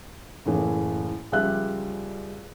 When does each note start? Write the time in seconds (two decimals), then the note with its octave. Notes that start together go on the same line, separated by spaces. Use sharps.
0.46 F#1 A2 E3
1.32 C#2 F3 G3 D5 E5 F#6